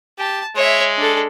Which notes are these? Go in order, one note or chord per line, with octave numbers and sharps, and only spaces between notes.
G4 A5
G#3 C#5 E5
D4 A4